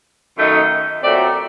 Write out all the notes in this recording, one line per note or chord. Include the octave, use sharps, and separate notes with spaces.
F#2 D#3 A3 D#4
A#2 F#3 A3 C4 D5